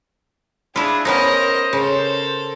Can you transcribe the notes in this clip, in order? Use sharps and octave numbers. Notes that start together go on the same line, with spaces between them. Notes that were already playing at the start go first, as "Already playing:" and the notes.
D4 E4 F4 G#4
B3 C#4 D#4 A#4 C5 D#5
C#3 A4 A#4